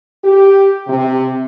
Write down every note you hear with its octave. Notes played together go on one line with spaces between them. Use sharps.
G4
C3